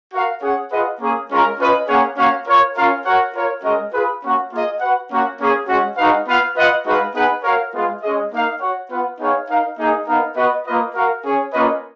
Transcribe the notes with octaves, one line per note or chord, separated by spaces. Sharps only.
F#4 A#4 F5
C#4 G#4 C#5 F#5
F4 G#4 B4 D#5 F#5
A#3 C#4 G#4
G#3 C#4 F4 A#4
C#4 F4 B4 D#5
A#3 C#4 G#4 C#5 F#5
A#3 C#4 F#4 C#5 F5
F4 A#4 C#5
C#4 F4 A#4 F5
F#4 A#4 C#5 F#5
F4 A#4 C#5
G#3 C#4 F#4 A#4 D#5
F4 G#4 B4
A#3 C#4 F#4
A#3 F4 G#4 D#5
F#4 B4 F#5
A#3 C#4 F#4
A#3 C#4 G#4
G#3 C#4 F#4
G#3 D#4 F#4 B4 F5
B3 F4 B4 F5
F4 B4 D#5 F#5
G#3 D#4 F#4 B4 F5
B3 D#4 G#4 B4 F#5
F#4 A#4 C#5 F5
G#3 B3 F4
G#3 C#4 G#4 D#5
A#3 D#4 A#4 F5
F#4 C#5 F#5
B3 F4 B4 F#5
B3 D#4 G#4 C#5 F5
D#4 A#4 F5
A#3 D#4 G#4 D#5
B3 D#4 A#4 F5
B3 F#4 B4 D#5
A#3 F4 B4 D#5
F#4 A#4 F5
C#4 G#4 C#5
A#3 C#4 F4 B4 D#5